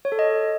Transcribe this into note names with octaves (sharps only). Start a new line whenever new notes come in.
C#5
A4
D#5